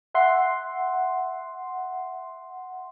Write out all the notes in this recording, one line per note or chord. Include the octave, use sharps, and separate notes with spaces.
E5 F#5 C6